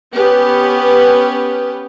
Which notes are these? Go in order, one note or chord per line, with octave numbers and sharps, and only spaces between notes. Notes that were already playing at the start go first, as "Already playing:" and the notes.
B3 C#4 G4 B4